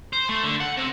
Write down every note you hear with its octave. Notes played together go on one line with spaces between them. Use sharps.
C5
A3
D3
F#5
C3